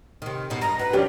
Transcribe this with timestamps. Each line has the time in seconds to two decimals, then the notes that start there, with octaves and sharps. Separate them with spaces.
0.22 C3 D#3
0.50 B2 D#4
0.61 G2 D#5 A#5
0.79 F#4 B4
0.93 F3 C#4 D4 G4